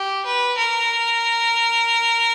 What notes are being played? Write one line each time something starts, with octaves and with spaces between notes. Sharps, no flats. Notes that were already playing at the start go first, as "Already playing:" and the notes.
Already playing: G4
B4
A#4